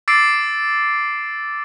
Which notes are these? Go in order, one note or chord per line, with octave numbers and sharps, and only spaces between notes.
D6 E6 A6 C7 D7